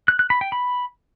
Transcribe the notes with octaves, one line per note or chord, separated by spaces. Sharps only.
F#6
F#6
B5
G5
B5